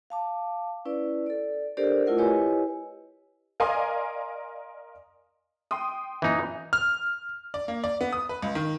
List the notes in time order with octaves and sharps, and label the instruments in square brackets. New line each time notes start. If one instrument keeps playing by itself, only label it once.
[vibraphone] F5 A5 D6
C#4 E4 B4 D5
A4 D5
D4 G4 A4 A#4 C5 D5
A3 E4 F4 A#4 D#5 F#5
E4 G4 B4 C#5 D#5 G#5
[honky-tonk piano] A#4 D5 D#5 F5 G#5 C6
G5 C6 D#6
[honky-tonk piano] F#2 A#2 [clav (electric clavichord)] E3 D#4
[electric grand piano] F6
[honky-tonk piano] D5
A#3
D5
B3
D#6
B4
C#2
D#3